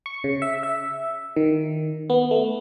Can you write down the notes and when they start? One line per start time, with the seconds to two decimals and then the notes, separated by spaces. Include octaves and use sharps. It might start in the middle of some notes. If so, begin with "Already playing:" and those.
0.06 C#6
0.24 C#3
0.42 E5
0.63 E5
1.36 D#3
2.10 B3
2.31 A3